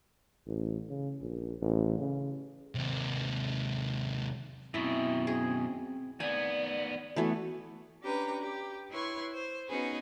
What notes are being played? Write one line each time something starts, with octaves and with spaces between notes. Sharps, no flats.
A1
C#3
A#1
A1
C#3
D#2 C3
F#2 B2 C4 E4
G#4
D#3 B3 D5 G#5
E3 A3 B3 F#4
C#4 D4 G4 B4 A#5
G4
E4 B4 C#5 C6 C#6
C5
B3 C#4 D#4 F#4 G#4 B4